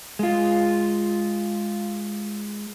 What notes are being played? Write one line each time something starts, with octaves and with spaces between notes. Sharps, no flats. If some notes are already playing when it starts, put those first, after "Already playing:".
G#3 F4